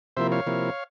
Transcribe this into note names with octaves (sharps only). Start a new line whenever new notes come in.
C3 F3 A#3 E4 C5 E5
C#5 F5
C3 F3 A#3 E4